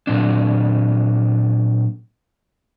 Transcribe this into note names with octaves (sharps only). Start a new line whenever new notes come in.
A#2 F#3 C4 D4